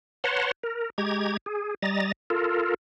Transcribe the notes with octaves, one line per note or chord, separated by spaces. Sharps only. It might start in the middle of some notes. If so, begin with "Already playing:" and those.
B4 C#5 F#5 A5 A#5 C6
A#4
G#3 G4 A#5 G#6
G#4
G3 D#5 A#5 A6
F4 A4 A#4